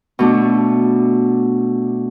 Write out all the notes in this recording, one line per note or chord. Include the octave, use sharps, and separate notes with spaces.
B2 A3 D4